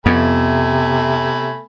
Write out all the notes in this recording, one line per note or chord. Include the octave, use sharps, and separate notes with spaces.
F2 C3 A3 B3 G#5 B5